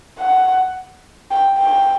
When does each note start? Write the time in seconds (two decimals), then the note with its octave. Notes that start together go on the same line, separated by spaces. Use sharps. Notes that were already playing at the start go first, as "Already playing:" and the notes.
0.19 F#5
1.31 G5
1.59 G5